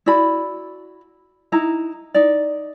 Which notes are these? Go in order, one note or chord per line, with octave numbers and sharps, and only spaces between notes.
E4 F#4 D5 B5
D#4 E4 A#5
D#4 D5